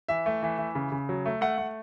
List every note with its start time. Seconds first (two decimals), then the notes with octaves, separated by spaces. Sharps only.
0.08 E3 E5
0.26 A3
0.42 E3
0.58 E3
0.75 C#3
0.92 C#3
1.09 F#3
1.26 A3
1.41 A3 F#5
1.58 A3